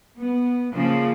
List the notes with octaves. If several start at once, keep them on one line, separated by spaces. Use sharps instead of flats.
B3
C#3 F3 A#3